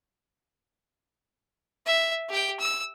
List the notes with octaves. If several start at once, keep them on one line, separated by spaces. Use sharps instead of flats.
E5
G4 G5
E6